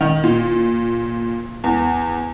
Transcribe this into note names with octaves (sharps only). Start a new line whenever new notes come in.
D#3
A#2
E2